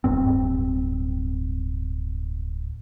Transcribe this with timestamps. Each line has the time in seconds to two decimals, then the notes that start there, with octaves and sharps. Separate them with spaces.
0.04 D1 G2 C4